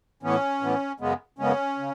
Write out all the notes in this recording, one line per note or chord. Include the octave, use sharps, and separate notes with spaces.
A2 E3 B3 C#4
A2 E3 B3
F#2 C#3 G#3 B3
F#2 C#3 G#3 B3 C#4
C#3